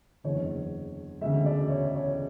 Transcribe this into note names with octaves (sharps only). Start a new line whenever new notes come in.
F#1 E2 D3 C#5
E1 D2 C#3 G#3 E5
D5
C#5
C#5